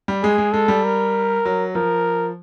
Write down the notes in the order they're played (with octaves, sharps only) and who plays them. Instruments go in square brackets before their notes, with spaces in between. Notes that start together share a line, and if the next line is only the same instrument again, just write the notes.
[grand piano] G3
[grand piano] G#3 [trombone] G#4
[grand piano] G#3
[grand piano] G#3 [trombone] A4
[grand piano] G3
[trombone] A#4
[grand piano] F#3
[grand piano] F3 [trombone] A#4